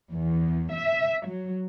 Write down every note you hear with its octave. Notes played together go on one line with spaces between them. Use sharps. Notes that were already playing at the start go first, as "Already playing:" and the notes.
E2
E5
F#3